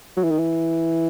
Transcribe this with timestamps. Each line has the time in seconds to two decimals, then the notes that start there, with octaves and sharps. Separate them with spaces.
0.17 F#3
0.24 E3
0.31 D#3
0.39 E3